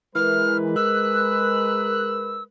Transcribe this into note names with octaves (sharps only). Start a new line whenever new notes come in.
E3 G#3 A#4 B4 F6
E6 F#6